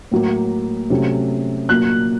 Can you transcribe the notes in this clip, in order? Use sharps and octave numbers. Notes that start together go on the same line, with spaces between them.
A2 F#3 A#3
C3 F#3 A3 C#4
A#2 F#3 A#3 F#6